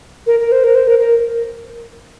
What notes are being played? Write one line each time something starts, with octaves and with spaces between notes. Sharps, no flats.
A#4
A#4
C5
A#4
C5
A#4
A#4